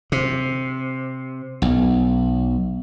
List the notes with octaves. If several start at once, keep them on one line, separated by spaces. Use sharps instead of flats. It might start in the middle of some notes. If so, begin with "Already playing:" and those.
C3
B1